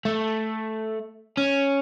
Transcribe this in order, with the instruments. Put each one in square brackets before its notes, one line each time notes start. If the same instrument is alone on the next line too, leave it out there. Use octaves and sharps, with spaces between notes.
[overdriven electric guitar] A3
C#4